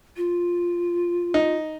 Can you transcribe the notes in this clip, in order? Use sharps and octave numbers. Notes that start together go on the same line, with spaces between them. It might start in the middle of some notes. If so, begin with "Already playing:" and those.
F4
D#4